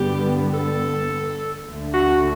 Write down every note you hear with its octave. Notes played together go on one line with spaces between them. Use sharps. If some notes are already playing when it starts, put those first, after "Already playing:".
Already playing: G2 D3 G3 B3 G4
A4
D2 D3 A3
F#4